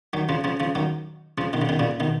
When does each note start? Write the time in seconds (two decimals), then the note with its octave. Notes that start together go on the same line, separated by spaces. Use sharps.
0.13 D#3 F#3
0.29 C#3 F3
0.44 C#3 F3
0.60 C#3 F3
0.75 D#3 F#3
1.38 C#3 F3
1.53 B2 D#3
1.62 C#3
1.69 B2 D#3
1.79 A#2 C#3
2.00 B2 D#3